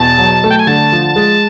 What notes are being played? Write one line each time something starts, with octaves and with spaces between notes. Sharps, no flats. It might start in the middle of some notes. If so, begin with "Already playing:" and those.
Already playing: E2 B2 A5
F#3
A3
G5
G#5
D3 A5
F3
G#3